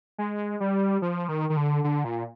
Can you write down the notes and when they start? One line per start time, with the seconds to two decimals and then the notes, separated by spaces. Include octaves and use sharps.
0.18 G#3
0.60 G3
1.02 F3
1.29 D#3
1.50 D#3
1.57 D3
1.84 D3
2.05 A#2